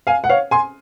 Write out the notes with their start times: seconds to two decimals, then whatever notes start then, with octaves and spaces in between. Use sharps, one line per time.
0.07 F5 G#5
0.24 F#5
0.29 C#5 F5
0.51 G#5 C6